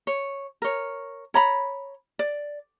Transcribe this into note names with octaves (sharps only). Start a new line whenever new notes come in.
C#5
A#4 C#5
C#5 A#5 B5
D5